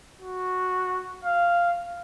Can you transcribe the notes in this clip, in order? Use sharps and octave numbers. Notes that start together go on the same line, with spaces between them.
F#4
F5